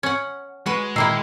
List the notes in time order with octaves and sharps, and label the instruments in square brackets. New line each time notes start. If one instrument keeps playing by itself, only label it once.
[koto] C#4 F#5
[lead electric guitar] G#3 [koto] F#4 B4
[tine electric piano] A#2 E6 C7 [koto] D#3 A#3 E4